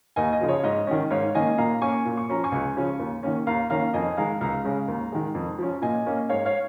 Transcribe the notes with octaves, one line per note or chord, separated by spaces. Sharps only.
D#2 D#5 G#5
D#5
C#3 F3
C#5
G#2 D#5
D#3 C#4
G#2 C#5 F5
D#3 A#3 C#4 D#5 G#5
A#2 F5 A#5
A#3 C#4 G#5 C#6
A#2
C#6
F3 C#4 A#5
G#5 C#6
C#2
C#3 F3 C#4
D#2
D#3 A#3 C#4
D#2 F5 A#5
D#3 A#3 C#4 F5 A#5
F2 D#5 G#5
D#3 G#3 F5 A#5
C#2 F5 A#5
C#3 G#3 C#4
D#2
D#3 G#3
F2
F3 C#4
A#2 D#5 G#5
A#3 C#4
G#2 C#5 F5
C#5 F5